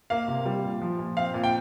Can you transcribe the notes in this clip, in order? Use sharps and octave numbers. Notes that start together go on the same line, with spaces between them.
A#3 F5
C3
G3
A#2
F3
A#2
C4 F5
A#2
G5